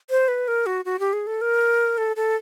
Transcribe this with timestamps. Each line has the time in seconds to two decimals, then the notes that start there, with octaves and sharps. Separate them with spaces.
0.10 C5
0.28 B4
0.48 A#4
0.66 F#4
0.85 F#4
0.99 G4
1.13 G#4
1.27 A4
1.41 A#4
1.98 A4
2.16 A4